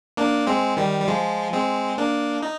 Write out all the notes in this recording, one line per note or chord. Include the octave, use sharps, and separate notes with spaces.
A#3 D4
G#3 C4
D#3 G3
G3
F3 G#3
G#3 C4
A#3 D4
D#4